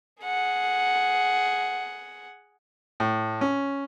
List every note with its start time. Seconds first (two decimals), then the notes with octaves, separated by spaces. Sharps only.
0.22 G#4 F#5
3.00 A2
3.41 C#4